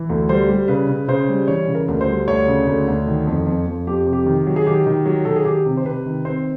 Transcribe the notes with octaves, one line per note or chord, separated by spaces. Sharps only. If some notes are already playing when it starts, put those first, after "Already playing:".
Already playing: E3
D2
G3 C5
G3
C#3 B4
C#3
C#3 C5
G3
E3 C#5
C#3
A#4
D2
C5
G3
D2 C#5
C#3
D2
D2
D#3
F2
F2
F2
F2 G4
C3
G4
D#3
F#3
G#4
D#3 G4
D#3
F#3
D#3 A4
G#4
D#3 G4
C3
C5
C3 B4
D#3
C4 C5